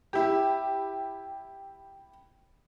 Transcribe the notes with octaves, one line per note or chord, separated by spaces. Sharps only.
E4 G4